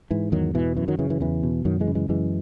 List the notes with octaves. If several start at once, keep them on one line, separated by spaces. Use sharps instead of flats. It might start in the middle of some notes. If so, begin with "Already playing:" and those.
G#2 E3
E2 D#3 F#3
B2 E3
F#2 E3
D#3 F#3
C#3 E3
E3
E2 E3
B2
F#2 D#3 F#3
E3 G#3
C#3
E3 G#3
F#2 E3 G#3